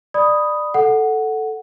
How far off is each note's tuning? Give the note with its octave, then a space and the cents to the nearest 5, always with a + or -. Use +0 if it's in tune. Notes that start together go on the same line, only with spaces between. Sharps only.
D5 +20 B5 +0 D#6 +0
A4 +0 F#5 +0